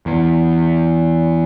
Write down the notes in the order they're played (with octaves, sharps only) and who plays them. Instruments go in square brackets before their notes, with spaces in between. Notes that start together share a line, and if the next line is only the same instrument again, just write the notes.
[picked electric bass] E2